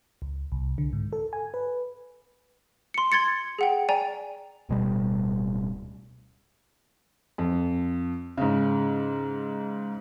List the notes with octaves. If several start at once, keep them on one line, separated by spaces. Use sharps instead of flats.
C#2
C2
D3
G#2
A4
G#5
B4
C6 C#7
C6 G#6 A6 C#7
G#4 F#5 G5
D5 G5 G#5 A#5
D1 B2 G3
F2
G#2 C#3